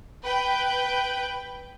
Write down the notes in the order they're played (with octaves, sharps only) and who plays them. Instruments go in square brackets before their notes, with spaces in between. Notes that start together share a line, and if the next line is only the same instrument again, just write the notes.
[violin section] B4 G5